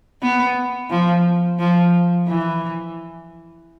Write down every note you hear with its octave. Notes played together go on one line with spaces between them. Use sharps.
B3
F3
F3
E3